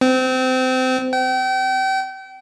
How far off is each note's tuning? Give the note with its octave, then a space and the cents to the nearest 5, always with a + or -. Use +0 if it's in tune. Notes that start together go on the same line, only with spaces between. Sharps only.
C4 -25
G5 -35